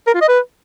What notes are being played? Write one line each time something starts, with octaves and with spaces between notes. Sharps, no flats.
A#4
F4
D#5
B4